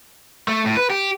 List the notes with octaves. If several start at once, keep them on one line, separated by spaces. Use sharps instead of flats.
A3
A2
B4
G4